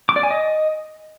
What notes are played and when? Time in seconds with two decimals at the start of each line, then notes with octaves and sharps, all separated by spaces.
0.09 D6
0.16 D5
0.23 G#5
0.31 D#5